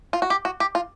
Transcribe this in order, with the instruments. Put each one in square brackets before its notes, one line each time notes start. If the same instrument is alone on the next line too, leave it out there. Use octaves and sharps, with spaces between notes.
[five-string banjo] F4
F#4
G4
F#4
G4
F4